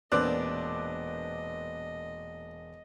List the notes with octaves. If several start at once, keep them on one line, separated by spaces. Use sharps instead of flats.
E1 A#2 B3 C4 D4 D#5 D6 F#6